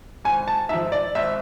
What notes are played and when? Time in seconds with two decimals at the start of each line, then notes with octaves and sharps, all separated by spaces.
0.24 G#1 G#5
0.48 A5
0.69 G#2 F3 E5
0.92 D5
1.15 G#1 E5